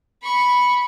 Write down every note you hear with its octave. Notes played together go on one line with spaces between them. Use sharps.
B5 C#6